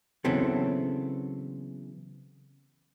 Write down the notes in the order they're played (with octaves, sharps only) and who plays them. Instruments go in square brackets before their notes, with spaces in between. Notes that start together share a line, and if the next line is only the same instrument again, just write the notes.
[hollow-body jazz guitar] C#3 E3 F#3 B3 C4 A4